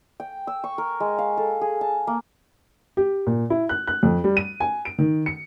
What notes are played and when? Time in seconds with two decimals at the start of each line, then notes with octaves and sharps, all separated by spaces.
0.20 G5
0.47 E6
0.64 C#6
0.78 A#4
1.00 G#3
1.18 F5
1.37 A4
1.61 G#4
1.81 A5
2.07 A#3
2.97 G4
3.27 A#2
3.50 E4
3.69 F#6
3.87 F#6
4.03 F2
4.24 G3
4.37 D#7
4.60 G#5
4.85 D7
4.99 D#3
5.26 C#7